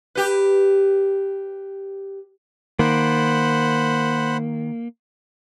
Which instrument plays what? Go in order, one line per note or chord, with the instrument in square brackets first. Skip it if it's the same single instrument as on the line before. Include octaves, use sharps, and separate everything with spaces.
[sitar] G4 B4
[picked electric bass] D#3 [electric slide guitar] A#3 [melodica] C5 F#5 B5